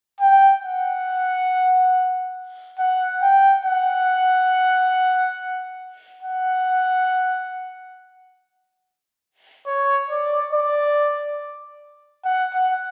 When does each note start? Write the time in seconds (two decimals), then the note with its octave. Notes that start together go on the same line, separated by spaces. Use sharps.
0.21 G5
0.64 F#5
2.79 F#5
3.22 G5
3.65 F#5
6.23 F#5
9.66 C#5
10.09 D5
10.53 D5
12.25 F#5
12.54 F#5